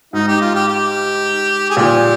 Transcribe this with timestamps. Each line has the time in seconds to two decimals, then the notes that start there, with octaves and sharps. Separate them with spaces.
0.13 G#2 D#4
0.28 G4
0.41 F4
0.55 G4
0.68 G4
1.70 G#4
1.77 A#2 G4